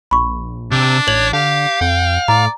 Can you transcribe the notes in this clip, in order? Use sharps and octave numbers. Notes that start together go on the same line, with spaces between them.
A#1 B5 C#6
C3 D4
A1 C#5 F#7
D3 G4 F5
F2 G5
A2 D5 A#5